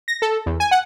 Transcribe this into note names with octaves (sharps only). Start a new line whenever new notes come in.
A#6
A4
E2
G#5
F#5